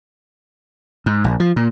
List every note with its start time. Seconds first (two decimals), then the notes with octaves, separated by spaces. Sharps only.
1.06 G#2
1.24 A#1
1.40 F3
1.56 A#2